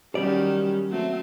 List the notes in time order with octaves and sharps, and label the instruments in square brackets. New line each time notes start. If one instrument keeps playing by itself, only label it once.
[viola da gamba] D#3 F#3 C#4 [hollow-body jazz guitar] G3 D5
[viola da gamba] F#3 A3 C4